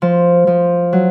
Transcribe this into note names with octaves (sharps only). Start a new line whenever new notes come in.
F3
F3
F#3